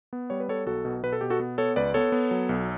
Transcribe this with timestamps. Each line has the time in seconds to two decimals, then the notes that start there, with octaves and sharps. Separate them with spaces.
0.13 B3
0.30 G3 C#5
0.40 B4
0.49 B3 A4 C#5
0.67 B1 F#4 A4
0.85 B2
1.03 B2 B4
1.13 A4
1.21 B2 G4
1.30 F#4 A4
1.40 B3
1.58 B3 A4 C#5
1.76 C#2 B4 D5
1.94 B3 A4 C#5
2.12 B3
2.31 F#3
2.49 B1